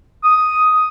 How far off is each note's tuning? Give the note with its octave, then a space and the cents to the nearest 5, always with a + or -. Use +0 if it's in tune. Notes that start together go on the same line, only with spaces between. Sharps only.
D#6 +5